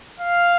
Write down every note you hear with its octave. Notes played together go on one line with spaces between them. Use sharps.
F5